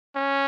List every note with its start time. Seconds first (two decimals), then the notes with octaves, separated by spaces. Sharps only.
0.16 C#4